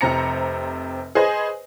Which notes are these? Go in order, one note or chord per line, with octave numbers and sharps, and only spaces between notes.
F1 C3 C4 A#5 A#6 C#7
G#4 B4 C5 D#5 G#5